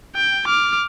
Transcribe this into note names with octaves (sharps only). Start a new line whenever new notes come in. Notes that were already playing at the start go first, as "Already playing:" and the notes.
G5
D6 F6